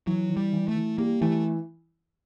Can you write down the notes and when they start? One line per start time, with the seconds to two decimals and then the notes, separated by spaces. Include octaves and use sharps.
0.07 E3 F#3
0.30 E3
0.37 G3
0.53 E3
0.68 A3
0.75 E3
0.98 G3 A#3
1.21 E3 A3